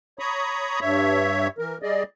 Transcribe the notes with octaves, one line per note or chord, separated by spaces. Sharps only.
C#5 A#5 B5 C#6 D#6
G2 C#5 E5
E3 A#4
G3 G#4 D5 D#5